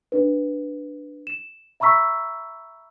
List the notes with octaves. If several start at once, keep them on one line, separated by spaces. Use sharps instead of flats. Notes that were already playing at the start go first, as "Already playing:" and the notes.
D4 B4
E7
E5 A#5 B5 C#6 E6 B6